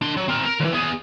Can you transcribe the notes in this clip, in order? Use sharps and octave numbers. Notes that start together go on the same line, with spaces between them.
D4 C6
F#3
C4 A#4
A#4
D#2 E3
B3 G#4